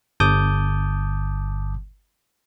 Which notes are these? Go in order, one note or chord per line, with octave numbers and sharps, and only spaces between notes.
G1 A5 D6 D#6 G6